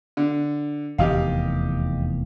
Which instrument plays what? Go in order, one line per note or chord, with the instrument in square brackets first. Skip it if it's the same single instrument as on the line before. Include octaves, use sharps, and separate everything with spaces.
[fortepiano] D3
[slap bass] F1 E2 D#3 [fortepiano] G4 D#5 F5